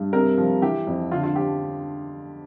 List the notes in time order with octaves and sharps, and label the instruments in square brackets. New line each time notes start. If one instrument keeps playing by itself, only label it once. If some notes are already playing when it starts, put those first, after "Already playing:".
Already playing: [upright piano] G2
C3 A#4
F3
E3 G4
F2
D3 F4
F4
F3 G4